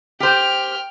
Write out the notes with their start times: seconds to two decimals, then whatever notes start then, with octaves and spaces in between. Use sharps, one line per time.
0.20 G4 C5 G5 F6